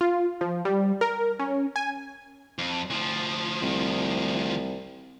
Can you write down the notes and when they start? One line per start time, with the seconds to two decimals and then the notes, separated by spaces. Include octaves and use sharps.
0.01 F4
0.41 F3
0.65 G3
1.01 A#4
1.39 C#4
1.76 G#5
2.59 F2
2.90 D2 F3
3.62 C2